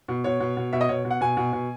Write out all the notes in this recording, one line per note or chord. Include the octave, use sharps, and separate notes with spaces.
B2
B2 C#5
B2
B2
B2 E5
D#5
B2 C#5
B2
F#5
B2 G#5
B2
B2